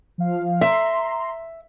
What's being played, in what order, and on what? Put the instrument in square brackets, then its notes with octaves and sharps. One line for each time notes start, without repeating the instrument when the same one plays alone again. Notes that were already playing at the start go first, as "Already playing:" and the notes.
[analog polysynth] F3 F5
[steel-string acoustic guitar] E5 [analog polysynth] A#5 C6